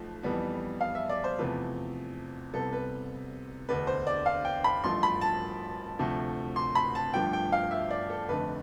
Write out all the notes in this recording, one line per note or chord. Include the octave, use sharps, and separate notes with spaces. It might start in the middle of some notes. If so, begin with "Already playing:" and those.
Already playing: B1 F3 A3
F2 E3 G3 B3
F5
E5
D5
C5
E2 C3 F3 A3 B4
C2 C3 G3 B3 A4
B4
E1 D2 D3 B4
C5
D5
F5
G5
B5
A1 G2 F3 A3 C6
B5
A5
D2 C3 F3 A3
C6
B5
A5
G1 G2 F3 A3 G5
G5
F5
E5
D5
A4
F1 F2 D3 A3 B4